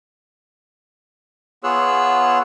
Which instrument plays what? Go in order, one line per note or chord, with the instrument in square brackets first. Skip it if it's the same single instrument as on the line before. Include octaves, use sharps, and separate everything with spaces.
[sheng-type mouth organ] B3 F4 G#4 C#5 E6 F#6